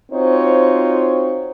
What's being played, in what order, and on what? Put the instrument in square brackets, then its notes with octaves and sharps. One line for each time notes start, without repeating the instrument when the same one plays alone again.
[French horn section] C4 D#4 F4 F#4 C5 C#5